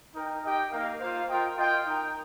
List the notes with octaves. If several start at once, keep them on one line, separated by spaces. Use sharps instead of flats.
D#4 A#4 G5
D#4 G4 D#5 G5
A#3 D#4 A#4 F5
A#3 F4 C5 F5
F4 A#4 D#5 G5
F4 D#5 G5
D#4 A#4 G5